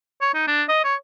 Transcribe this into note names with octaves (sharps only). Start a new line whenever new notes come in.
C#5
D#4
D4
D#5
C#5